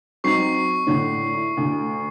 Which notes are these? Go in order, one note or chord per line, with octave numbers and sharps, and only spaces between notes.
F#3 C4 D#4 C#6 C7
A2 D3 D4
E4
D2